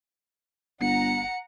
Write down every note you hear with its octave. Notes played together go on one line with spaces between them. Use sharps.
G1 F#5 A#5 C#7